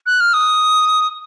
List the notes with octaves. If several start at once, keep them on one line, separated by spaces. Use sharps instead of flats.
F#6
F6
D#6